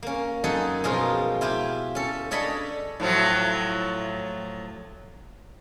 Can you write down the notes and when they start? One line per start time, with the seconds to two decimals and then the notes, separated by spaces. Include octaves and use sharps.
0.03 A#3 C#4
0.44 F#2 D#4 A4 F#5 G#5
0.84 B2 F3 G#3 D#4 F4 A#4
1.41 E4 F4 G4
1.95 C#4 A4
2.31 D4 A4 C#5 D#5 B5
3.00 A2 F3 F#3